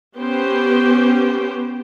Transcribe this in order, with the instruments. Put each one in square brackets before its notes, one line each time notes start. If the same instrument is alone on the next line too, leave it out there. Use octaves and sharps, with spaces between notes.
[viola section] B3 C#4 G4 C5 G5